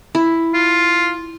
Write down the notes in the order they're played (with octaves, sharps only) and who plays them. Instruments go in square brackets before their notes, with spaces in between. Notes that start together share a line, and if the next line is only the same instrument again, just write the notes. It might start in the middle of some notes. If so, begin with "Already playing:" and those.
[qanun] E4
[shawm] F4